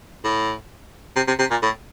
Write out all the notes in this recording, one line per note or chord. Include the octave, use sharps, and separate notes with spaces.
A2
C3
C3
C3
A#2
A2